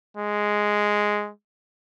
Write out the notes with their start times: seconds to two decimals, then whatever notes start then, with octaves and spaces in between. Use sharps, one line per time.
0.17 G#3